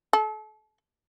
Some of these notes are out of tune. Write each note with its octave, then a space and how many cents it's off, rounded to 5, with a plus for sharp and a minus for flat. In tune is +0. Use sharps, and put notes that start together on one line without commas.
A4 -35